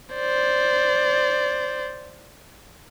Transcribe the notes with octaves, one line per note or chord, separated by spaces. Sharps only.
C5 D5